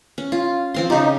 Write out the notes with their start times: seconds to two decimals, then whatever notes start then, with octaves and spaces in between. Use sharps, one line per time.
0.18 C#4
0.32 F4
0.74 F3 C4 C6
0.90 C#3 D#4 G4